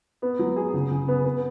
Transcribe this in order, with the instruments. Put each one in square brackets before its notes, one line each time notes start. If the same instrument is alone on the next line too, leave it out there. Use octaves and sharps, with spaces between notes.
[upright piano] B3
F#3
G#4
C#3
C#3
B3
B3